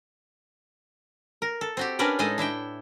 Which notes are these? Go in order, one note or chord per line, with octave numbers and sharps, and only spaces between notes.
A#4
A4
C4 F#4 G4
C#4 D4 A#4 B4 D5
A2 G#3 D#4 A4 D#5 G#5
D4 E4 E5 G5